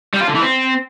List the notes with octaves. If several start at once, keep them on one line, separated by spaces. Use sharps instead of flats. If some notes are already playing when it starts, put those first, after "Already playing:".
G3
F4
D3
E3
C4